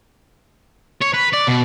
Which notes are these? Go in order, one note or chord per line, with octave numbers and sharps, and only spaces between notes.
C#5
B4
D5
B2